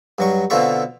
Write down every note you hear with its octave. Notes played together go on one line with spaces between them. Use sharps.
G2 F#3 C#6
B2 D3 C4 F4 E5 C#6